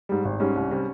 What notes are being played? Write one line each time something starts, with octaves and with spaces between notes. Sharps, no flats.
G#2 G3
G#1
G#2 G3 C#4
C2
C3 G3